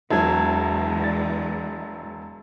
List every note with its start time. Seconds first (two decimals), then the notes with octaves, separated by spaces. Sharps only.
0.11 E1 E2 E3 F#3 G#3 E5 A5 G#6
1.04 D5 A6